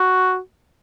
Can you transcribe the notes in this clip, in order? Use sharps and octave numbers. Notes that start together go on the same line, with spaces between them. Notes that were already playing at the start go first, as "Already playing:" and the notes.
Already playing: F#4